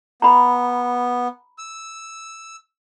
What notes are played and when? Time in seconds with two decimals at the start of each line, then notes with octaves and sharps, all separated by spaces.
0.22 B3 A#5 B5
1.58 E6